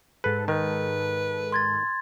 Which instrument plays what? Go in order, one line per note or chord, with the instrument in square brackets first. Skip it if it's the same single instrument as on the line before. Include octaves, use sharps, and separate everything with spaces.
[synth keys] G#2 A4 [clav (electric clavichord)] B4
[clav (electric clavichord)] D#3 [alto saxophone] B4
[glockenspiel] C6 G#6 A6